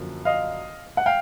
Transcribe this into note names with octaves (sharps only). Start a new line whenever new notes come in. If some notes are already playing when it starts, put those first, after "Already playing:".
Already playing: F#2 D3 F3 A#3
D#5 F5
F#5
F5 G5